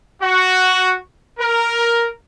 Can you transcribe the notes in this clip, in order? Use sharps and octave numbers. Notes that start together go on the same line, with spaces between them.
F#4
A#4